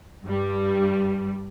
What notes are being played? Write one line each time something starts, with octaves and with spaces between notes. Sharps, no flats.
G2 G3